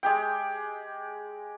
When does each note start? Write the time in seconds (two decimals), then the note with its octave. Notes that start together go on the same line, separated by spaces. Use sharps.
0.03 G#3 G4 G5